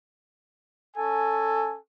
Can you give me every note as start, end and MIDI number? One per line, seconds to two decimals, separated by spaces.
0.97 1.76 61
0.97 1.76 69
0.97 1.76 80